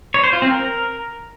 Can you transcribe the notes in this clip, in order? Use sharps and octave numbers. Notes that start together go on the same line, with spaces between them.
C#5
C5
F4
C4
A#4